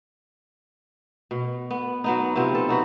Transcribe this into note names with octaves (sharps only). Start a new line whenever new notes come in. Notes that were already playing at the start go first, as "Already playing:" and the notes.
B2
B3
F#3 B3 D#4
C3 F3 B3 C4
A4
D#4 F#4 B4